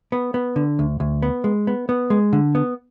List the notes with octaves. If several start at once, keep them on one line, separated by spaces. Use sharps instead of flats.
B3
B3
D3
D2
D2
B3
G#3
B3
B3
G#3
D3
B3